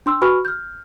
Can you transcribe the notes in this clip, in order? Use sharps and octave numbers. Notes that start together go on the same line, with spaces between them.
D4 C6 E6
F#4 B4 G#5 B5 C#6 F6
F6 G6